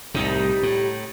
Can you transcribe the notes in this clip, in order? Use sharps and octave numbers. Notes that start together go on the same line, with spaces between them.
C2 A2 C3 G3 D#4
A2